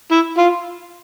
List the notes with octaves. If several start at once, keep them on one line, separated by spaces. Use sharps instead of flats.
E4
F4